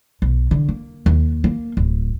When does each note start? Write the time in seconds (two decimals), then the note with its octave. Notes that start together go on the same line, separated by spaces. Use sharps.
0.22 B1
0.51 D3
0.69 A#3
1.06 D#2
1.44 A#3
1.77 D1